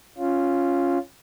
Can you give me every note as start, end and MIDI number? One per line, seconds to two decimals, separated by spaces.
0.18 0.98 61
0.18 0.98 65